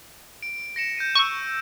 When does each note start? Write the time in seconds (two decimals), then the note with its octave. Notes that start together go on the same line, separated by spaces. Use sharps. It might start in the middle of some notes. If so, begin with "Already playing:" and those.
0.43 D7
0.76 A#6 C#7 E7
0.97 G6 A#6 D#7
1.15 C#6 E6 D#7